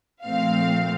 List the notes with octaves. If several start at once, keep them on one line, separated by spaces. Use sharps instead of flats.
A#2 F3 A3 C4 F5